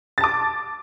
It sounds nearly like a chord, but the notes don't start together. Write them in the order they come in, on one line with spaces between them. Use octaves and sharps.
A6 A5 D6